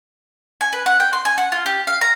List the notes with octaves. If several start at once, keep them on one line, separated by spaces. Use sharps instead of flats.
G#5
B4
F#5
G5
C6
G#5
F#5
F4
G4
F5
A#5